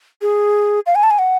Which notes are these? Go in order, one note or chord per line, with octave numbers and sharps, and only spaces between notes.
G#4
F5
G#5
A5
G#5
F#5